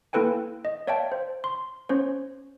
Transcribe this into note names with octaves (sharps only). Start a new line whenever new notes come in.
A#3 E4 A4 B4 G5 G#5
D#5
C#5 D5 E5 F5 G5 A5
C5
C6
C#4 C5 C#5